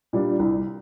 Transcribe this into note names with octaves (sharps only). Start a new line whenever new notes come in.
A#2 G3 D4
C2